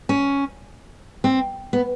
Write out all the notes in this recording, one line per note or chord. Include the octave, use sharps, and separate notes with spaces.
C#4
C4
B3